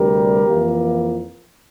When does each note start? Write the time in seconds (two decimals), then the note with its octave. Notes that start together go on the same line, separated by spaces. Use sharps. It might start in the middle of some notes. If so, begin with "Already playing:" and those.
Already playing: D2 C3 G3 G4 A#4
0.48 F2 E3 A#3